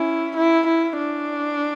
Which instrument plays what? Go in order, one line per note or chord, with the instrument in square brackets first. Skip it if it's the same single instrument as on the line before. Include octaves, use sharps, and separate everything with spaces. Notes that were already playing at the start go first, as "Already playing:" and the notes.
Already playing: [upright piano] C#4 [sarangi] E4
[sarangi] E4
E4
D4